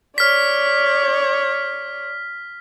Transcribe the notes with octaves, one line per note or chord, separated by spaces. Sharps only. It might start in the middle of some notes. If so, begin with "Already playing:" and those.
C#5 D5 F6 B6